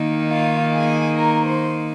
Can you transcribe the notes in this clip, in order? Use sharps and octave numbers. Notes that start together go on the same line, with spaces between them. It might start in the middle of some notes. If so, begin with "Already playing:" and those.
Already playing: D#3 A#3 D#4
F4 F5
G#4 G#5
A#4 A#5
C5 C6